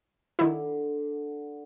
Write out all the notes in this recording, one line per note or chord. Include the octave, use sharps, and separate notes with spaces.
D3 D#3 E4